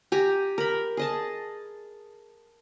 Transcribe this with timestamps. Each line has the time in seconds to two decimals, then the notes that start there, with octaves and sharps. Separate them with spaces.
0.12 G4 G#5 A#5
0.58 A#4 B5
0.97 G#4 D#5 A5